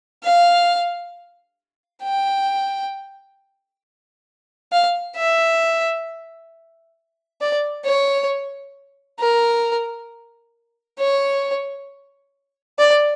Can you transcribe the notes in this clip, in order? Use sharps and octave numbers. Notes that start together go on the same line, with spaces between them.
F5
G5
F5
E5
D5
C#5
A#4
C#5
D5